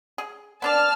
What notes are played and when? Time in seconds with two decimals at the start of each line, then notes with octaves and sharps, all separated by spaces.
0.18 G#4
0.62 B3 D4 D5 A5 F6